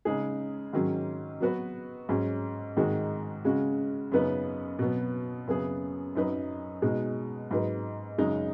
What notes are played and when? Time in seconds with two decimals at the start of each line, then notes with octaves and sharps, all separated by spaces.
0.05 C#3 G#3 D#4 G#4
0.73 G#2 D#3 F#3 C#4
1.40 F#3 B3 F#4 B4
2.09 G#2 F#3 C#4
2.77 G#2 D#3 G#3 D#4 F#4
3.45 C#3 G#3 C#4 F#4
4.12 F#2 C#3 B3 D#4 B4
4.79 B2 F#3 B3
5.47 F#2 C#3 B3 G#4
6.15 F#2 F#3 D#4 B4
6.82 B2 G#3 D#4
7.51 G#2 F#3 D#4 B4
8.18 F#2 C#3 G#3 D#4